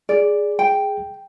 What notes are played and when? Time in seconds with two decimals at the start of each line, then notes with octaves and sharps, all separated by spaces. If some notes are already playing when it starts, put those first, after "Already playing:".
0.09 G#4 D5
0.59 G5